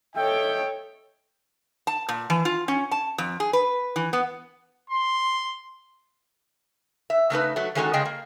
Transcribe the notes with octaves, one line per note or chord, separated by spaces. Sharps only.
A4 C#5 D#5 E5 G5
A5
A#2
E3
F4
C#4
A5
F2
G#4
B4
E3
B3
C6
E5
C#3 A3 D#4 B4
F#3 A3
D#3 G#3 A3 C#4 F#4 A4
C#3 G#3 G#4 D#5 G5
A#3